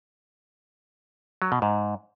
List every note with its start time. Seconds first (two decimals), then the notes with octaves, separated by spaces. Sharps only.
1.42 F#3
1.52 B2
1.62 G#2